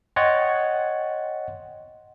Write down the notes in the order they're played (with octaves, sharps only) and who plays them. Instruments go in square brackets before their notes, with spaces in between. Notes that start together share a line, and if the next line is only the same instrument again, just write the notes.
[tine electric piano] C#5 D#5 F#5 G5 C6 A6